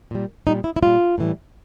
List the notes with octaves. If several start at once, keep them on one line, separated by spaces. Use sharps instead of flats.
A#2 G3
A#2 G3 D#4
E4
E4
A#2 G3 F4
A2 E3 G3